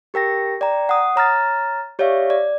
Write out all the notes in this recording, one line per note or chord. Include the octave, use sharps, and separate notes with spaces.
G4 A#4 G5 A#6
D5 G5 A#5
F#5 D#6
C#5 A#5 F6 A6
G4 C#5 D5 E5 F5
D5